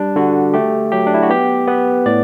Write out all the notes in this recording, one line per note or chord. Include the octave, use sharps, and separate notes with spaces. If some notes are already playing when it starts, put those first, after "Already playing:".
Already playing: G3 D4
D3 F#4
A3 G4
F#3 G4
D4
E4
F#4
B3 G4
B3 B4
A2 D5